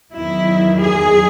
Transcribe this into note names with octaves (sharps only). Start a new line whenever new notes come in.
E2 D#3 F#3 E4
G#4